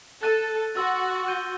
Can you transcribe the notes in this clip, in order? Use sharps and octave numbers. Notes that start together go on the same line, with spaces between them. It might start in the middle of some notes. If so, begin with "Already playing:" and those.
A4 F#6 A6 D#7
F#4 C6 E6 A6
G6 D#7 G7